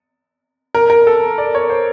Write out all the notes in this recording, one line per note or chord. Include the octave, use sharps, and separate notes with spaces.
A#4
A#4
A4
D5
C#5
C5